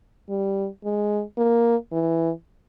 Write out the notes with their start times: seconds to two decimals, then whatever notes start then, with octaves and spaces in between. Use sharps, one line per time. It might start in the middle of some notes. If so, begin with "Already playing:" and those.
0.29 G3
0.84 G#3
1.38 A#3
1.92 E3